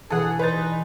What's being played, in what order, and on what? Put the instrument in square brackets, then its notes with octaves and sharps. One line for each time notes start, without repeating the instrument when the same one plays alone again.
[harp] B2 E3 G#5 [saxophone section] G#4 [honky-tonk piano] A4 F#5
[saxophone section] D#4 [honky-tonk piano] B4 A6 [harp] C5 D5 G#5